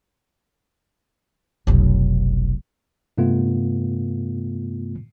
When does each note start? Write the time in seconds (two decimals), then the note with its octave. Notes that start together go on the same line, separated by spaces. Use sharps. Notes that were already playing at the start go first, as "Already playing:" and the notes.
1.67 F1 B1
3.18 G2 C3 A3 B3 F4